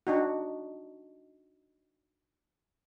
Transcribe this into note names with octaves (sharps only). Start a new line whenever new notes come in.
D4 D#4 F#4